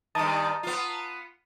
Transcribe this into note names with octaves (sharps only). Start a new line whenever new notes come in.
G2 D#3 A5 A#5 D#6
B3 F4